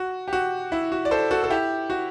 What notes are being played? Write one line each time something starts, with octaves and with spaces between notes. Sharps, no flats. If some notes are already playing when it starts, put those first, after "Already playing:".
Already playing: F#4
G4
F#4
E4
F#4
D5
A4 C5
F#4 A4
A4
E4 G4
F#4